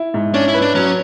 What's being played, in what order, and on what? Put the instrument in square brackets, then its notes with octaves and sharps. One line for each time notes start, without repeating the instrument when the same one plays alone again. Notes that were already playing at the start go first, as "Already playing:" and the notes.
Already playing: [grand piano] E4
G#2
[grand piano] C#4 [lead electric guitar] D4
[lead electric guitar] E4
[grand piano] B4
[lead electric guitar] D4
[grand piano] F#3 [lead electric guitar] C#4